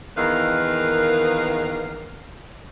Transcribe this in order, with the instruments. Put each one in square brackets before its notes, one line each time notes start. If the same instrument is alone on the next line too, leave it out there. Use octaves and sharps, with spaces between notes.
[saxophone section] E2 D#3 A#3 B4 F5